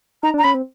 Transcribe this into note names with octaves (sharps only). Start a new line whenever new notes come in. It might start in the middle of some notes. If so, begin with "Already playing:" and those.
D#4 A#5
D4
A#5
C#4 B5
C4